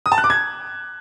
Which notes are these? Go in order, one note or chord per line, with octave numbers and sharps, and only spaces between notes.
D#6
A5
F#6
D6
G#6